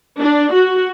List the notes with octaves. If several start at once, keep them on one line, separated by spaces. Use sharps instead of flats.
D4
F#4